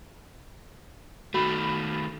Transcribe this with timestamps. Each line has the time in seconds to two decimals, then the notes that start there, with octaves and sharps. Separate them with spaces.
1.34 D#3 A3 F#4 B5